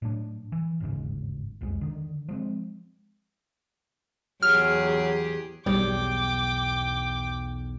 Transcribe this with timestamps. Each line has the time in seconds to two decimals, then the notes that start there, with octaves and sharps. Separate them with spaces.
0.02 A2 F#3 A3 D4
0.52 E3
0.80 G1 D#2 G#2 C#3
1.61 F#1 C2 F2 G#3
1.81 D3 D#3
2.28 F3 G#3 C4
4.43 E2 F#3 G4 G#4 F6
5.66 B1 E2 G3 G5 D6